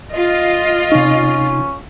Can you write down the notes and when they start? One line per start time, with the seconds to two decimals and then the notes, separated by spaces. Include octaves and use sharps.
0.14 F4 D#5
0.92 C3 C#4 D#4